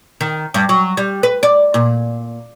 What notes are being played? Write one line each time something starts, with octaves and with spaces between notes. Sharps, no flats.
D#3
G2
F#3
G3
B4
D5
A#2